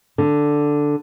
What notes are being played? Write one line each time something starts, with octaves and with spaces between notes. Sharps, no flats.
D3